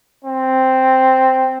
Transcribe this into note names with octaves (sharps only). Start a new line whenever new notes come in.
C4